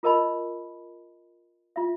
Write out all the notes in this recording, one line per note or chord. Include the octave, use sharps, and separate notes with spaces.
F4 G#4 A#4 D#5 A5 B5
F4 E5